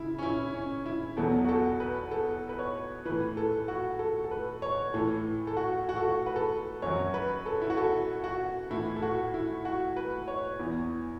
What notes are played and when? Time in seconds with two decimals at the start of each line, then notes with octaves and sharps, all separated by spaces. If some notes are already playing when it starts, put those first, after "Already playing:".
Already playing: C#3 E4
0.18 C#4
0.23 E4
0.54 C#4
0.86 E4
1.17 E2 B2 F#3 A4
1.45 F#4
1.49 A4
1.80 B4
2.11 A4
2.49 B4
2.59 C#5
3.05 A2 E3 B4
3.37 A4
3.68 F#4
3.99 A4
4.24 A4
4.31 B4
4.62 C#5
4.94 A2 E3 A4
5.47 A4
5.57 F#4
5.89 F#4
5.96 A4
6.04 F#4
6.26 B4
6.36 A4
6.82 F#2 F#3 C#5
7.14 B4
7.46 A4
7.62 E4
7.70 F#4
7.77 A4
8.24 F#4
8.70 A2 E3 E4
8.96 A4
9.02 F#4
9.34 E4
9.65 F#4
9.96 B4
10.28 C#5
10.59 E2 E3